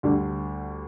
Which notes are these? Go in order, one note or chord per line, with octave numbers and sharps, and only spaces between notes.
D2 D3 G3 D4